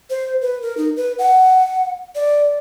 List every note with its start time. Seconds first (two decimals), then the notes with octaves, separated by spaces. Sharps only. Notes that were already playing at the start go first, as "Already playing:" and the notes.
0.10 C5
0.42 B4
0.62 A#4
0.77 D#4
0.97 B4
1.19 F#5
2.15 D5